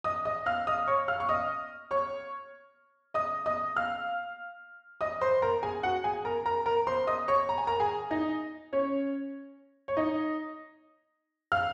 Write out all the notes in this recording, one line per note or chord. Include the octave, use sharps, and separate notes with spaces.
D#5 D#6
D#5 D#6
F5 F6
D#5 D#6
C#5 C#6
F5 F6
C#6
D#5 D#6
C#5 C#6
D#5 D#6
D#5 D#6
F5 F6
D#5 D#6
C5 C6
A#4 A#5
G#4 G#5
F#4 F#5
G#4 G#5
A#4 A#5
A#4 A#5
A#4 A#5
C5 C6
D#5 D#6
C#5 C#6
A#5
G#5
A#4 A#5
G#4 G#5
D#4 D#5
C#4 C#5
C#5
D#4 D#5
F5 F6